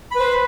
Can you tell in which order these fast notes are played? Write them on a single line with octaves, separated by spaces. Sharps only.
B5 B4 C5